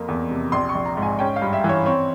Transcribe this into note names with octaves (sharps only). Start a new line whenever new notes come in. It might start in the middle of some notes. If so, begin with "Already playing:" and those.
Already playing: F2 A#3
E2
C3
A#1 C6
C#6
A#1
A#5
G#2
G#5
C#4 G5
F5
G2
E5
E3
C#5
C4 C#5